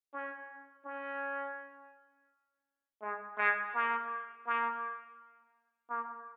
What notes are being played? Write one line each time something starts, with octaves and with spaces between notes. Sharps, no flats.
C#4
C#4
G#3
G#3
A#3
A#3
A#3